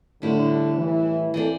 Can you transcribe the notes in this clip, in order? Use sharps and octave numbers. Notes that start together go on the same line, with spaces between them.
A2 D3 G3 E4 G4
E3
E3 C4 A4 D5